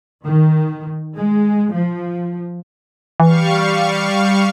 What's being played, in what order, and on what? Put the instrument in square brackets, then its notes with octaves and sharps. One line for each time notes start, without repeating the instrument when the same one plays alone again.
[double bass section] D#3
G#3
F3
[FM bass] E3 [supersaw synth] G3 F5 C#6